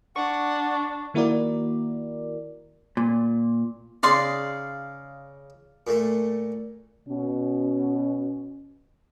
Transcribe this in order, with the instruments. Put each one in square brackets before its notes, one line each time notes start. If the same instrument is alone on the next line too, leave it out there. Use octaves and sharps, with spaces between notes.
[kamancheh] D4 [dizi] F#5 [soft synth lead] C#6
[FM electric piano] D#3 A#3 E4 F#4 A#4 D5
[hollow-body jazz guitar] A#2
[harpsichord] C#3 D#4 [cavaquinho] D5 F5 C6
[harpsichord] A#2 A3
[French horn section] B2 C#4